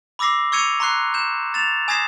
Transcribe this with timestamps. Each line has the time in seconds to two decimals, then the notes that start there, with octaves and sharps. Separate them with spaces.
0.19 B5 D6 E6 A#6 C7
0.52 C#6 E6 G#6 C#7 D#7 F7
0.80 A#5 C6 C#6 F#6 C7
1.14 G6 E7
1.54 A6 E7 F7
1.88 G#5 D#6 G#6 A#6 C7 E7